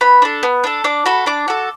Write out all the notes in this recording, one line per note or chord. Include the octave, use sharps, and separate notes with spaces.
B3 B5
D4 A4
B3
D4 A4
D4 D6
F#4 A4 B5
D4 D6
F#4 A4